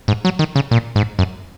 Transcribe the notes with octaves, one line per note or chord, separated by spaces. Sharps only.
G#2
F#3
D#3
C#3
A#2
G#2
F#2